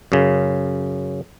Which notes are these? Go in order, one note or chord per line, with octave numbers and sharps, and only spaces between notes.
F#2 C#3